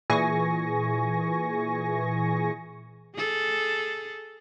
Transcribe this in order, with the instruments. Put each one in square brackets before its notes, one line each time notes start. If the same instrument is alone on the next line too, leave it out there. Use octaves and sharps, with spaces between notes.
[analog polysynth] A#2 E3 G#4 G#5 C#6 A#6
[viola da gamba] G#4 A4